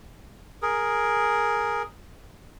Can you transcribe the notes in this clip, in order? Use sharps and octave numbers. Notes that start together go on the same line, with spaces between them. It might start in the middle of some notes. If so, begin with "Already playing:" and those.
G#4 A#4